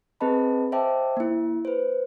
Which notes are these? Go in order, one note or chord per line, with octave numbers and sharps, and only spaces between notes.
C4 G#4 B4 D#5 A5 B5
C5 D#5 E5 G5 A5 D6
A#3 E4
B4 C5